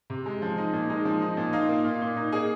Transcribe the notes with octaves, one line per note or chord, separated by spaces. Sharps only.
C3
G#3
F3
D#4
A#2
G#3 D#4
F3
D#4
A#2
D#4 F4
A#3
A#2
A#2
D#4
A#3 D#4 G#4